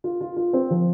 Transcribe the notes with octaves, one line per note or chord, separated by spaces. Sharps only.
F4
F4
F4
C4
F3